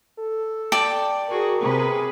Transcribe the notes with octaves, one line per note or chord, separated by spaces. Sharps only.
A4
D5 G5 A5
F#4 G#4 A#4
C3 G#4 B4